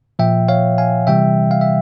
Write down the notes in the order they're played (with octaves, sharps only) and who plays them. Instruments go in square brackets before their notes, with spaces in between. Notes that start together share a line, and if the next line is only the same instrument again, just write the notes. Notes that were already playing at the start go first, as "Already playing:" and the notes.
[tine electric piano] A#2 F3 E5 G5
C#5 F5
F5 G#5
C3 E3 G3 E5 G5
F5
E5